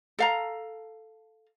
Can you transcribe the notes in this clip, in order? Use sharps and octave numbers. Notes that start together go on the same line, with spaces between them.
A4 F5 A#5